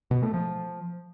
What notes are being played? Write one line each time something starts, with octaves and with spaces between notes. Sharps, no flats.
B2
A3
F3